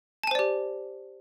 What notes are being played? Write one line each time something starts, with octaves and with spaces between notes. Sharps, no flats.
G4 C5 D5 G#5 A5